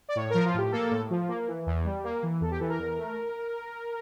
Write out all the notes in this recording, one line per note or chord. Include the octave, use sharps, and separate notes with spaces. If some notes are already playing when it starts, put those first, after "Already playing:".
D5
A2 C#5
F3 A#4
F4
A2 G4
A#3 A4
A2
F3
A#3
E3
E2
G3
A#3
E3
E2 A4
G4
E3 A4
A#4
E2
A3